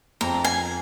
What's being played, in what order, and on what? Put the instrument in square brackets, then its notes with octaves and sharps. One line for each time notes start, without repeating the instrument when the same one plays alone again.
[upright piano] F2 [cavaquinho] A#5
[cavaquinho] G#5